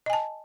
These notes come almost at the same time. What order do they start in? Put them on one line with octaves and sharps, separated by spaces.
D#5 G#5 A5